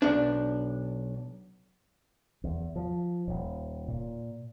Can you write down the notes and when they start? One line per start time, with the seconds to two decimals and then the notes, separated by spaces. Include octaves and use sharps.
0.02 B1 D4
2.44 E2
2.76 F3
3.27 D#1
3.88 A#2